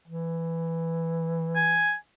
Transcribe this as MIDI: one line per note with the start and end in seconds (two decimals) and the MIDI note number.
0.08 1.94 52
1.56 1.94 80